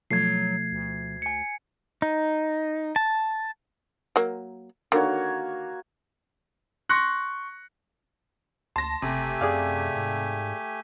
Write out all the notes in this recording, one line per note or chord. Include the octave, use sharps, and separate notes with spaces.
B2 F3 F#3 A3 G#6 C7
D2
G#5 C#7
D#4
A5
F#3 A#3
D3 D#3 A#3 F#4 C#5
C6 C#6 F#6 A#6 C#7
D2 A5 C6 A#6
F#1 C3 A3 G4 G#5
F#2 G#4 D5 F5
G#2